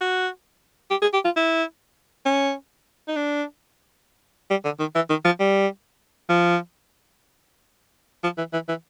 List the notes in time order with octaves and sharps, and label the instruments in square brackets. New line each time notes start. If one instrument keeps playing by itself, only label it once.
[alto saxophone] F#4
G4
G#4
G4
F4
E4
C#4
D#4
D4
G3
D3
D#3
E3
D#3
F3
G3
F3
F3
E3
E3
E3